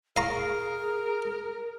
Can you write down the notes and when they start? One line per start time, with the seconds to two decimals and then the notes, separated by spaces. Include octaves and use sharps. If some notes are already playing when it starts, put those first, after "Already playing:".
0.16 G#4 A#4 F5 A#5 C#6